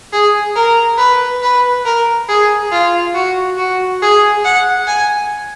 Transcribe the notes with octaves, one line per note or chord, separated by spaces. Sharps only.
G#4
A#4
B4
B4
A#4
G#4
F4
F#4
F#4
G#4
F#5
G#5